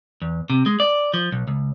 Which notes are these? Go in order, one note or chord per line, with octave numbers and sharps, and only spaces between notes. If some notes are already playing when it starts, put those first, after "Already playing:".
E2
C3
G#3
D5
F3
B1
C#2